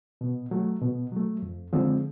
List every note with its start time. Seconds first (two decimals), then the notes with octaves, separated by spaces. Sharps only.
0.21 B2
0.51 F#3 A3
0.82 B2
1.12 F#3 A3
1.42 F2
1.73 D3 F3 G#3 C4